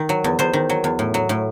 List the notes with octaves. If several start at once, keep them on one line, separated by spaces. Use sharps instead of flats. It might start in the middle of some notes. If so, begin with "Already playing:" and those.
Already playing: D#3
F#3
E2
E2 C5
D#3
F#3
E2
A2
F#3
A2